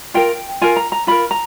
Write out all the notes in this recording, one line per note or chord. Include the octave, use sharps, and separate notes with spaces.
F4 A#4 G5
F4 A#4 G#5
A#5
A#5
F4 A#4 B5
A#5